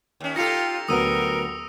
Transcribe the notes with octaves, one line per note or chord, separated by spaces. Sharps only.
D#2 C#4
D#4 F4 G4 A4 A#6 C#7 F7
D2 F#3 B3 A#4 D#6 E6 D#7